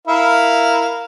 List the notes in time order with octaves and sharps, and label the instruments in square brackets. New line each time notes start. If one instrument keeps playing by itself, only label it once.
[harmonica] E4 A#4 F5